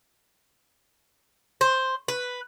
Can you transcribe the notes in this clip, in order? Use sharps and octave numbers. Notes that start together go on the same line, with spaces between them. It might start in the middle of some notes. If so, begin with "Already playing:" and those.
C5
B4